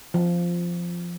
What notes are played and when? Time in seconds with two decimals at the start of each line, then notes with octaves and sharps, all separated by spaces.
0.14 F3